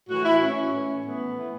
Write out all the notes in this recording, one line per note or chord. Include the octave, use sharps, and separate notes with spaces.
A2 E3 F#4
E4
A2 E3 C#4
A2 E3
A2 E3 B3
A2 E3